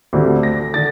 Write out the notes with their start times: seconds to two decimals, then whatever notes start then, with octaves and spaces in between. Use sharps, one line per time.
0.13 D2 D3 G3 C4
0.43 A#6
0.74 D3 A6